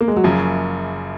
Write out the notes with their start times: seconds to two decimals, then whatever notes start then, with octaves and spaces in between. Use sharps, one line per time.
0.01 A#3
0.08 G#3
0.16 F#3
0.24 F#1 F#2 C#3 F3